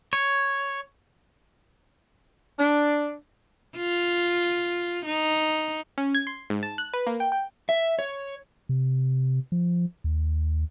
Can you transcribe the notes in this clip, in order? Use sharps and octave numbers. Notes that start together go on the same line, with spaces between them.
C#5
D4
F4
D#4
C#4
G#6
C6
G#2
A5
F#6
B4
A#3
G5
G5
E5
C#5
C3
F3
D#2